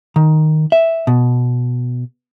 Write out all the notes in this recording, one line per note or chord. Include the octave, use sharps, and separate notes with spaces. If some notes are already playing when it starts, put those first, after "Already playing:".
D#3
E5
B2